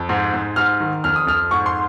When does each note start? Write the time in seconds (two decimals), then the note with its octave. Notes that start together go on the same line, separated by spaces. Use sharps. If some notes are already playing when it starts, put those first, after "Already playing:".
Already playing: F2
0.09 G#2
0.34 G#2
0.56 G#2 F6
0.80 D#3
1.04 F2 F6
1.16 D#6
1.27 F2 F6
1.51 G#2 C#6
1.66 C6